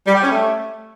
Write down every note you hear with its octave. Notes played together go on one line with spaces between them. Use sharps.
G3
G4
C#4
A3